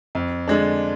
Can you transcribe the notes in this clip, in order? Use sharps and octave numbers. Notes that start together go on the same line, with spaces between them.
F2
D3 G#3 D4